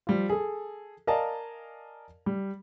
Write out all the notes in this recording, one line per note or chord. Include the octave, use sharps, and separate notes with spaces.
F3 G3 F4
G#4 A4
A#4 D5 D#5 F5 G#5 A5
G3